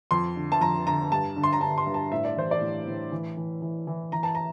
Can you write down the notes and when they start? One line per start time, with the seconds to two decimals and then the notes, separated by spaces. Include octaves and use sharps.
0.11 F2 C6
0.36 D3
0.52 A5
0.61 F2 A#5
0.86 D3 A#5
1.12 G2 A5
1.36 D3
1.43 C6
1.53 A#5
1.61 D3 A5
1.78 C6
1.86 G2
1.94 A5
2.12 A2 E5
2.25 D5
2.36 E3 C5
2.51 D5
2.61 A2
2.87 A2
3.12 E3
3.37 E3
3.62 E3
3.87 E3
4.12 E3 A#5
4.23 A5
4.35 A#5